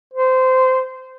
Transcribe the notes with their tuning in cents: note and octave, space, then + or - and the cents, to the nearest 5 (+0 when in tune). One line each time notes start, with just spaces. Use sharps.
C5 -20